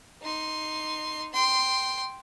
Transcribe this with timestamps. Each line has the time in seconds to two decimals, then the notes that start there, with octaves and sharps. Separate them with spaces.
0.22 D#4 C6
1.33 G5 C6